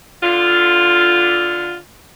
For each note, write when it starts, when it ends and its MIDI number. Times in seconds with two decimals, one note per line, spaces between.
0.23 1.75 50
0.23 1.75 65